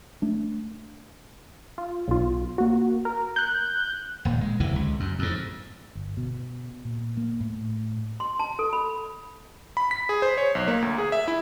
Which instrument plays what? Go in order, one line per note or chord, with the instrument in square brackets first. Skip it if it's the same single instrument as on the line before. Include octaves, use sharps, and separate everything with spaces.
[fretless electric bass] A3 D4
[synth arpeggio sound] F4
B1 F4
A#3 F#4
A#4
F#6 G6
[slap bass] D#1 A#2
G#3
F#1 D2 C3 E3
C#2
F#2
F2 G#2
[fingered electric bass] G1
B2
A#2
A#3
A2
[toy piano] C6
A5
A4
B5
[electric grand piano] B5
B6
G#4
C5
C#5
B1
A#3
D2
G#4
E5
E4